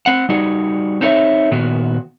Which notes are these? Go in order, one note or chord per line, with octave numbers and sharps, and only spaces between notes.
C4 F#5
G3 D#4 F#4 G#4
C4 D#4 A4 C#5 D#5 E5
A#2 D#3 B3 F#4